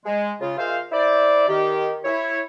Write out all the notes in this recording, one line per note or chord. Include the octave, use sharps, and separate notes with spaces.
G#3
C#3 F4
G#3 F4 A#4 C5 E5 F5
E4 C5 D5
D#3 G4
E4 C#5